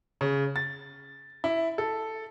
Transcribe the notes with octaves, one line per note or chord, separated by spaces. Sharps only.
C#3
A6
E4
A4